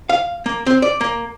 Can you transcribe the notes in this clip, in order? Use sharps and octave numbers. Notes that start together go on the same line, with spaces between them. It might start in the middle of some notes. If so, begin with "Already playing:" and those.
F5
A#3
C4
D5
A#3